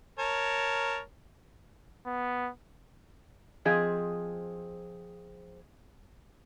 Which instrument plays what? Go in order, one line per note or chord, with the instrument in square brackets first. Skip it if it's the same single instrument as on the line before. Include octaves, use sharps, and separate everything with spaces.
[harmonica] A#4 C#5 A5
[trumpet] B3
[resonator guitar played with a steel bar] F3 C4 G#4 D#5